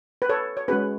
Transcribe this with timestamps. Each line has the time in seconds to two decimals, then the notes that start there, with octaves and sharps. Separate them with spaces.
0.22 B4
0.29 A4 C#5
0.57 C#5
0.68 G#3 C#4 F#4 G#4 B4